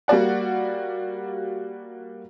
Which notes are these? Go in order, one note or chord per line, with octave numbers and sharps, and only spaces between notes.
G3 A#3 F#4 D5 F#5